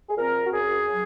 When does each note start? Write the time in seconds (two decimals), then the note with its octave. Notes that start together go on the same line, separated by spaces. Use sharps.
0.09 G#4
0.16 A#2 F3 C4 A#4
0.46 F#4
0.51 F#2 G#4
0.87 C#3 F#3